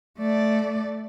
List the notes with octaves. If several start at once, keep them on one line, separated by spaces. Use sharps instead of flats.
A3 D5